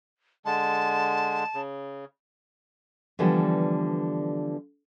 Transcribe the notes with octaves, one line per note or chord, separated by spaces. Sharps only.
D3 G#3 A5
C#3
D3 E3 F3 G3 B3